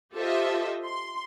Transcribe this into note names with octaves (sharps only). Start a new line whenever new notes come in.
F4 G4 A4 C5 D#5 E5
C6